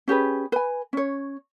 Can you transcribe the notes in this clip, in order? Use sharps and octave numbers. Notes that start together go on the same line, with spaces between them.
C#4 G4 G#4 B4
B4 G#5
C#4 C#5